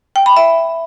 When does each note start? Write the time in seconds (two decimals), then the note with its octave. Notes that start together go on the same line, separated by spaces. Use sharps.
0.16 G5
0.26 B5
0.36 E5